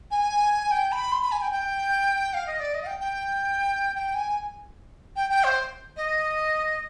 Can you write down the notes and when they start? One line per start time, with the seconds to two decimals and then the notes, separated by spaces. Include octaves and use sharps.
0.11 G#5
0.71 G5
0.92 B5
1.12 C6
1.21 B5
1.31 G#5
1.41 G5
1.52 G5
2.33 F5
2.47 D#5
2.59 D5
2.74 D#5
2.82 F5
2.86 G5
3.00 G5
3.95 G5
4.14 G#5
5.16 G5
5.30 G5
5.44 C5
5.96 D#5